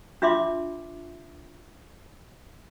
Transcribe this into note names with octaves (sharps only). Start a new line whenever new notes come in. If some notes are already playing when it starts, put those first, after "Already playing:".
D4 F4 E5 C6 D6